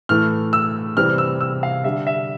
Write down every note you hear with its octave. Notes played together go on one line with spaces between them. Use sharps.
A2 E3 A3 F6
E6
C3 E3 G3 C4 F6
E6
E6
F5
D3 G3 D4 E5
E5